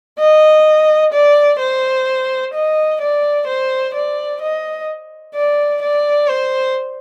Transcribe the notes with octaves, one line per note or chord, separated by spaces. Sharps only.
D#5
D5
C5
D#5
D5
C5
D5
D#5
D5
D5
C5